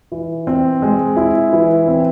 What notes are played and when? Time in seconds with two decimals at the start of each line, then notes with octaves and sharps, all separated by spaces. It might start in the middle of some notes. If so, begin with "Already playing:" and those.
0.12 E3
0.47 C4
0.82 G#3
1.16 E4
1.53 E3
1.88 C4